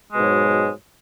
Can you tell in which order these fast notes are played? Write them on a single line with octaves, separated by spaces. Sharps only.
G#3 B2 G#2 F#3